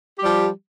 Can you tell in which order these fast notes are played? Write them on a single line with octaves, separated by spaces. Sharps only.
G4 G3 F3